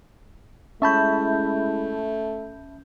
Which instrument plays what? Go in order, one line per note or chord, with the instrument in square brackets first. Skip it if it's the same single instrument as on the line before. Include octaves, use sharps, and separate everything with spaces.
[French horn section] G#3 E4 [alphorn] A3 [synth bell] C#4 G6 [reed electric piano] E5 A5 B5